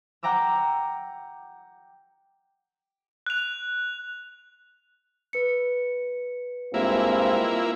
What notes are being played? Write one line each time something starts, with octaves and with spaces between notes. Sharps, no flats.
F#5 G5 A#5 D6 E6
F#6 F7
B4 C#7
G2 G#3 A#3 C4 E4 F4